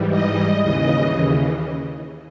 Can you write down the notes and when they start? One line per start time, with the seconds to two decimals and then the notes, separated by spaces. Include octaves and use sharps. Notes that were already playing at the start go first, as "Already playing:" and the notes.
Already playing: G#2 E3 G3
0.11 D#5
0.62 D#2 C#3 E3